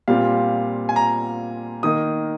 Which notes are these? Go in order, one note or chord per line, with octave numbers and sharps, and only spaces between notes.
A#2 G3 C4 F4 F5
G#5
A#5
D#3 A#3 D#4 D#6